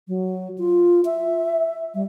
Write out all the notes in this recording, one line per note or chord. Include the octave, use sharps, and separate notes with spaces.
F#3
F4
E5
G3